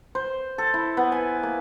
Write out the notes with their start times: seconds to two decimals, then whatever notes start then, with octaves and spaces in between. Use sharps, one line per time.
0.15 C5
0.58 A4
0.74 E4
0.97 B3
1.12 G#5
1.43 A#3